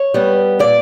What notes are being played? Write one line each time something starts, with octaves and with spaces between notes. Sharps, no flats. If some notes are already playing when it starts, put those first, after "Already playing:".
Already playing: C#5
G3 B3
A#2 D5